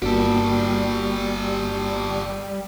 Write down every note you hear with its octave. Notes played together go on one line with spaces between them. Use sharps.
G1 G3 A#3 F#4 G4 A4